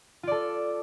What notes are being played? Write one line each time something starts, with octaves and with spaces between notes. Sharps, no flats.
F4 A4 D5